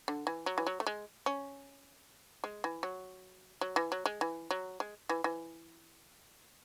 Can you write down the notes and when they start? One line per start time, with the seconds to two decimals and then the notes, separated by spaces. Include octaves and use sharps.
0.08 D3
0.27 E3
0.46 F#3
0.58 E3
0.67 F#3
0.80 A3
0.87 G#3
1.26 C#4
2.44 G#3
2.64 E3
2.83 F#3
3.61 F#3
3.76 E3
3.92 F#3
4.06 G#3
4.21 E3
4.51 F#3
4.80 G#3
5.09 E3
5.24 E3